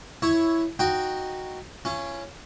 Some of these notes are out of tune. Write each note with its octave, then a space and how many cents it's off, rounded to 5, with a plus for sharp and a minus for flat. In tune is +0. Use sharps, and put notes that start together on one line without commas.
E4 +0 C#5 +0
D#4 -5 F#4 -5 G5 +0
C#4 +0 F4 -45